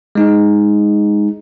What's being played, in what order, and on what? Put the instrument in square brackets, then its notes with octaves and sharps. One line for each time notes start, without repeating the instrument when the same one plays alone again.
[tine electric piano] G#3 D#4